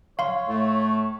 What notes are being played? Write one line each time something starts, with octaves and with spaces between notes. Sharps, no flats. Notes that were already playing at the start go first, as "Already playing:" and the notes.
C#5 F5 C6
A2 A3